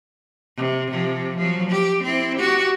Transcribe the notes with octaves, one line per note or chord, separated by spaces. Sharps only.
C3
C3 F3
F3 F#3
G4
C4 E4
F#4 G4